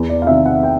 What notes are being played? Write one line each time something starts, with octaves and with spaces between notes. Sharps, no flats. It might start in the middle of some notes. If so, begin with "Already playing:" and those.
Already playing: E2
D5
F5
C3 D#3 E5
F#5
G5